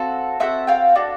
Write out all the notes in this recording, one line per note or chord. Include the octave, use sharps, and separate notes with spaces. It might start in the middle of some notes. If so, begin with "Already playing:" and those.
Already playing: C4 F#4 A4 F5
C4 D#4 F#4 A4 E5 F#5
F5 G5
D4 F#4 A4